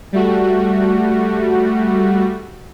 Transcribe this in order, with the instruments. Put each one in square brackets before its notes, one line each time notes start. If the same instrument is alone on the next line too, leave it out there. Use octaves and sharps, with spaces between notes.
[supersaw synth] G3 A3 F#4